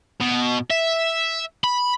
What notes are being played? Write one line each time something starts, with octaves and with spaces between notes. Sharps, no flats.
B2
E5
B5